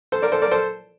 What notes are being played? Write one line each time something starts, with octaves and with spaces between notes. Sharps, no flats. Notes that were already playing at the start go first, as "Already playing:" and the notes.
A4 C5
A#4 D5
A4 C5
A#4 D5
A4 C5